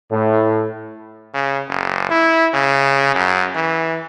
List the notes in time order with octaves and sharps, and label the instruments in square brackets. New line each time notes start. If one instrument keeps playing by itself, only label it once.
[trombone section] A2
[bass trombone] C#3
F#1
E4
C#3
F#2
E3